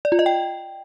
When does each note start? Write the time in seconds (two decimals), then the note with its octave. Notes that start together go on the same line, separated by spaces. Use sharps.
0.05 D5
0.12 F4
0.19 D#5
0.26 G5